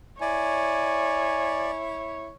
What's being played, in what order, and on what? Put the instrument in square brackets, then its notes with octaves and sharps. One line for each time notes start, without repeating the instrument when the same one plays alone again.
[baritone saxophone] E4 [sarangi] C#5 [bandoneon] D5 [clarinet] G#5